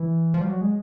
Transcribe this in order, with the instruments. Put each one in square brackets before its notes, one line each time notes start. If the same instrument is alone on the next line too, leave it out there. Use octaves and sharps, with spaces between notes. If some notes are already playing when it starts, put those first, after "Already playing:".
Already playing: [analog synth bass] E3
F3
G3
F#3
G#3